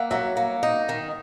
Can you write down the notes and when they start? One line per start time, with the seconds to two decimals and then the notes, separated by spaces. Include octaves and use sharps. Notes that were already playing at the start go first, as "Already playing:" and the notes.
Already playing: A#3 E5 F#5
0.11 F#3 E5 F#5
0.37 A#3
0.63 D#4
0.89 D#3